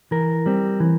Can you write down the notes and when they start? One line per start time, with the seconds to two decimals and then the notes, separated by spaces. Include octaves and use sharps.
0.11 E3 A#4
0.46 G3 C4
0.80 E3